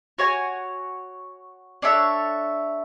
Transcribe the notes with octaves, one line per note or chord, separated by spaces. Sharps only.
F#4 C#5 G#5
D4 A4 C#5 E5